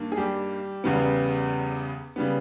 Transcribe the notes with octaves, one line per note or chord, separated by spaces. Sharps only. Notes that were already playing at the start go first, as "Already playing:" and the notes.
Already playing: G2 D#3 A#3
G#4
G3 G4
E2 C#3 G3 B3
C#3 G3 B3